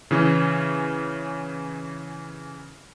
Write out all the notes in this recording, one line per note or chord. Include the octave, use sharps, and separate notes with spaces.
C#3 E3 C#4